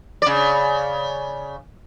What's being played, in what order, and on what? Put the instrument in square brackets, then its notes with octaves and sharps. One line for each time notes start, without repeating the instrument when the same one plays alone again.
[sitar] C#3 D5